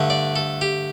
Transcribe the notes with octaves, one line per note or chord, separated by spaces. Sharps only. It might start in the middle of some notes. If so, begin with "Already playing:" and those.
Already playing: G2 D3 A3
D5
A4
G4